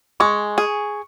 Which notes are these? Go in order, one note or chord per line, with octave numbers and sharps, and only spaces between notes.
G#3 C#6
G#4